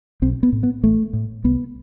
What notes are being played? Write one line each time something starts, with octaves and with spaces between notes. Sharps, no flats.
B1 C4
B3
A2
B3
A1 A3
A2
C2 B3